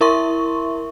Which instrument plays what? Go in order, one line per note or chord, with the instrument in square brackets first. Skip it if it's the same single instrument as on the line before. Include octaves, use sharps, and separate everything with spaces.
[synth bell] E4 A#4 E5 C6 C#6